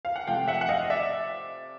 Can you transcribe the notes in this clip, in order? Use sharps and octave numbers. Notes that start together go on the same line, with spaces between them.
F5
F#5
C3 F3 A3 F5 G5
E5 F#5
F#5
D#5 F5
D5 E5